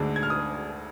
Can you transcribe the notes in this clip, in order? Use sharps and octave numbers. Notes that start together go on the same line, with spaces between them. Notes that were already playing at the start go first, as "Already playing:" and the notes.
Already playing: D2 D3 G#3 D4
G#6
F6
D#6